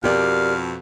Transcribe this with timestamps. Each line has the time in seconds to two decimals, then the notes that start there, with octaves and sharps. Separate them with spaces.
0.04 F2 B2 G4 A#4 D5 F5